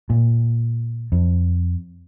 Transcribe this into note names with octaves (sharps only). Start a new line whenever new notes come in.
A#2
F2